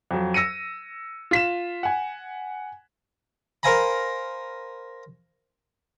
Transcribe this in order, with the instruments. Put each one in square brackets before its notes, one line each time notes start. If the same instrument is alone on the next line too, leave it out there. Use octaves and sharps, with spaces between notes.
[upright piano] F2 F#3
E6 A#6 C#7 D#7
F4 B6 E7
F#5 G#5
[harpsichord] A#4 C5 F5 G#5 A#5 B5